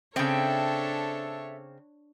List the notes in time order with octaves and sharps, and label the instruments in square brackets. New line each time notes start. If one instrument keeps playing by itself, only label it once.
[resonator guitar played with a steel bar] C#3 C4 [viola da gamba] D4 C#5 [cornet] A4 [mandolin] E5 G5